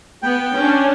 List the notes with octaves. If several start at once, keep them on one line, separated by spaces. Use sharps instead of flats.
B3 G5
C#4 D4